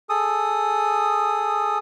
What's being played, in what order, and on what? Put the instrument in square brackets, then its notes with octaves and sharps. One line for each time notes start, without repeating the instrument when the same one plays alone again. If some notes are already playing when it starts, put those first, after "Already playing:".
[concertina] G#4 A4 D#6